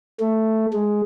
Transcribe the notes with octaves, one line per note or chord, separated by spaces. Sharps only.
A3
G#3